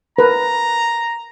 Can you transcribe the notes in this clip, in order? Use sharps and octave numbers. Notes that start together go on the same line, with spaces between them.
A#4 B4 A#5